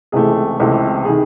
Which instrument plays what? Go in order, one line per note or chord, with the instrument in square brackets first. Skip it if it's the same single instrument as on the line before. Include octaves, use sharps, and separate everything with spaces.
[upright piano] C#2 C3 E3 A3 G#4
C#2 C3 E3 A3
C3 D#3 G#4